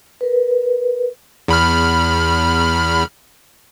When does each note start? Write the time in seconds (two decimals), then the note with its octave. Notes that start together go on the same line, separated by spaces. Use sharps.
0.21 A#4 B4
1.48 E2 B5 F6